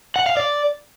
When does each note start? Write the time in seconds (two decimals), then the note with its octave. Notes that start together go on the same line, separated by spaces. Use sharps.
0.16 F#5
0.26 F5
0.37 D5